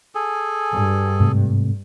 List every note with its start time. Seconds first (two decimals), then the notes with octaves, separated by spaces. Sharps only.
0.15 G#4 A4 G#5
0.73 G2
1.20 G#2 C3 A3